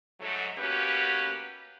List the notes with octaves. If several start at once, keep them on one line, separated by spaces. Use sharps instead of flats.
G#2 F#3 A3
B2 A#3 C#4 F#4 G4 B4